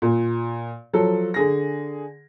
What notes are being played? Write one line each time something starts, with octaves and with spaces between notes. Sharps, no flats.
A#2
F3 F#3 A4
D3 G#4 A#6